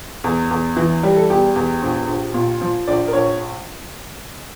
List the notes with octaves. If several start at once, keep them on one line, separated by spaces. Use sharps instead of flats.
E2
E2
E3
G3 G4
A4
E2 G4
E2
A#1
A#1
A#2
F3
A#1 D5
A#4
A#1 C#5